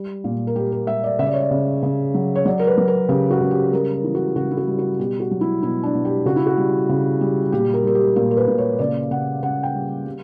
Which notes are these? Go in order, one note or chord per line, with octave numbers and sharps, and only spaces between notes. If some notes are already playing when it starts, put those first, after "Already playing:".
Already playing: G3
A#2
A#4
G3 G4
A#4
G3 E5
D5
C#3 E5
D5
C#5
D5
C#3
C#3
F#3
C#5
F#3 D5
A#4
B4
F#3
A#4
C#3 G4
F#4
C#3
G4
G3 A#4
A#4
E3
F#4
C#3 F#4
E4
F#4
G3
F#4
B2 G4
F#4
F#3
E4
B2 E4
D4
B2
G4
C#3 F#4
E4
F#4
G3
C#3
G3
A#2 G4
A#4
G3 A#4
G4
A#2 A#4
A#4
B4
A#2
C#5
C#3 D5
C#3 F#5
C#3 F#5
G5
G3
G3